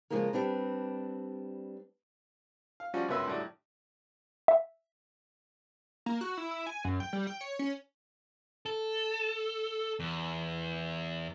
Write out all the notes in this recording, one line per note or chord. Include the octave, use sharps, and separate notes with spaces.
C#3 E3 F3 G#3 A#3 A#4
G3 C4 D4 B4
F5
F3 G3 C#4 F4 F#4
C#2 F#2 B2 B4 E5 C6
A2 D3 F#3 G3
E5
A#3
F#4
E4
E4
G#5
F#2
G5
G3
G5
C#5
C#4
A4
E2